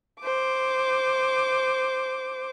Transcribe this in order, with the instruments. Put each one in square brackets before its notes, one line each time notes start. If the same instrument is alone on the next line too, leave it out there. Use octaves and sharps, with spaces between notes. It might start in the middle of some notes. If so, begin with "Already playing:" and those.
[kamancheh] C5 D6